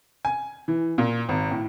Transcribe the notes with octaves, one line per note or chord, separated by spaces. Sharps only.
G#5
E3
A#2
G#1
A2